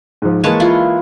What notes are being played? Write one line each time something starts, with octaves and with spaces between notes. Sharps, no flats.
G#2 F3
E3 G#3 A#3 B4 C#5 A5
E4 F4